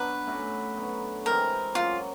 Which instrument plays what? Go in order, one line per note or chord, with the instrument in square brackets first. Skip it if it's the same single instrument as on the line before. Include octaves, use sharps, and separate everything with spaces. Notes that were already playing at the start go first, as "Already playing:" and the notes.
Already playing: [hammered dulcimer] B2 F#3 B3 D4 [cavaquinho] B4
[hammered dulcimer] A3 C#4 F#4
D3 F#3 B3
[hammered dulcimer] E3 G#3 C4 [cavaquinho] A#4
[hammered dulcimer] F#3 A#3 C#4 [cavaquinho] F4